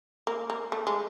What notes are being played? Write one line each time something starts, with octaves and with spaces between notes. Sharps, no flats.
A#3
A#3
A3
G#3